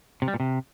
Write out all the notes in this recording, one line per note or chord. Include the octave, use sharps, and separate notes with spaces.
C3
G3
A#2
C3